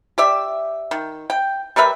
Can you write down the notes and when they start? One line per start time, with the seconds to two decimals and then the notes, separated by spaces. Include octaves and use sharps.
0.18 G4 D5 E5
0.91 D#3
1.30 G5
1.76 G3 A#4 B4 E5